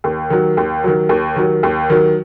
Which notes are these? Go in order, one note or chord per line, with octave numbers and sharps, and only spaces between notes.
D#2
D#3 F#3
D#2
D#3 F#3
D#2
D#3 F#3
D#2
D#3 F#3